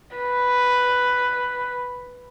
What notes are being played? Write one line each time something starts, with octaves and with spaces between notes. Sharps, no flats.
B4